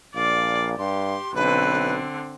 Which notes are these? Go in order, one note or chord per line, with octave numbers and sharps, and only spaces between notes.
A#1 D5 F5
G2 G4 C6
B1 D3 C4 B4